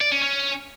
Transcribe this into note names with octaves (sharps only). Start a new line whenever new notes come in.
D5
C#4
C#4